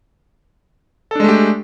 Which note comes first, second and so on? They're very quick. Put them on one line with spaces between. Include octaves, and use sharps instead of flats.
A4 D4 G#3 A3 G4